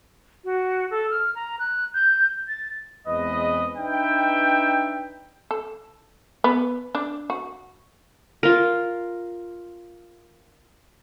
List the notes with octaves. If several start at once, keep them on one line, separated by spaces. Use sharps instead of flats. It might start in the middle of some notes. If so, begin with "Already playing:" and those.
F#4
A4
F6
A#5
F#6
G6
A6
E2 G#3 C4 B4 D#5
D4 D#4 B4 E5 G5
A4
B3
D4
F#4
F4 A#4